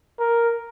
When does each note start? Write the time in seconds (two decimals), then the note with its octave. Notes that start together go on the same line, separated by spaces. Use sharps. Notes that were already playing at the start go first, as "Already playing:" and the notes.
0.20 A#4